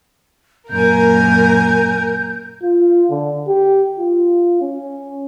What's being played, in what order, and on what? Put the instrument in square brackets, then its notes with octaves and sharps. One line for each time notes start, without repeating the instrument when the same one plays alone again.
[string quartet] F#2 A#2 G#5 [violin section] A#4 [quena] G6
[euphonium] F4
D3
G4
F4
C#4